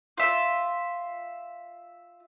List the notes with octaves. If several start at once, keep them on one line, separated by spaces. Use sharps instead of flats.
F4 E5